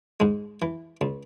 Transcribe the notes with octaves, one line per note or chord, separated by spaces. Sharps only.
G#2 G#3
E3
C#2